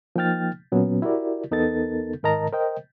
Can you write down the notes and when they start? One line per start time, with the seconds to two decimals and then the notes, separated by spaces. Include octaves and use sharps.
0.16 F3 A#3 D#4 G5 F6 A6
0.72 A#2 F#3 B3 C#4
1.02 E4 F#4 G4 A#4 D5
1.51 E2 B3 D#4 A4 A#4 A6
2.23 G#2 D#3 A#4 D#5 A5 A#5
2.52 A#4 C5 D#5 G5